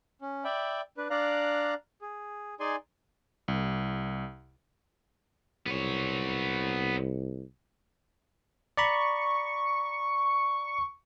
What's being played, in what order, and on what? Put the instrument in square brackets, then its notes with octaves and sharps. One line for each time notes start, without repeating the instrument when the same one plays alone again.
[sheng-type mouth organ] C#4
D5 E5 G5 B5
D4 B4
D4 D5 F5 A#5 F#6
G#4
D#4 G#4 D5 G#5 C6
[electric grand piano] C2
[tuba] C2 [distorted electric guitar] B3 C#5
[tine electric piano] D5 A#5 B5 [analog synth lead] C#6